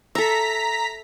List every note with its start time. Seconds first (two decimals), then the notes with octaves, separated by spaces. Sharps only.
0.15 A4 E5 A#5 B6